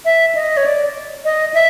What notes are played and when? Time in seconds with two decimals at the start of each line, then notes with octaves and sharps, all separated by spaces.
0.05 E5
0.35 D#5
0.57 C#5
0.66 D5
1.25 D#5
1.54 E5